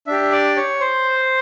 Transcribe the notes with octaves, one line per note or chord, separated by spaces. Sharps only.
D4 G4 E5
D5
C#5
C5